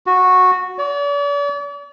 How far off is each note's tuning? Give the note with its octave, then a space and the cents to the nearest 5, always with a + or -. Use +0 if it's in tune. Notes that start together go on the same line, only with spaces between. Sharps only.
F#4 -10
D5 -45